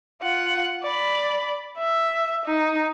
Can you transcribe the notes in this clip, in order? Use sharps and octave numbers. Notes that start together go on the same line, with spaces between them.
F4 F#5
D5 B5
E5
D#4